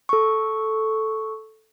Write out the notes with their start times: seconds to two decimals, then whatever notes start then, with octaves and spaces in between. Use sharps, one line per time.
0.09 A4 C#6